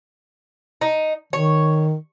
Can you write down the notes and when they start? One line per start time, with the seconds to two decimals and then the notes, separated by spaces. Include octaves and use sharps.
0.81 D#4
1.33 D#3 C#5